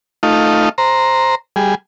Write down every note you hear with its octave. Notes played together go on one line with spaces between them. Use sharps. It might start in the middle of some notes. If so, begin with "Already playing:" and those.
A3 D#4 F4
C5 A#5
G3 G#4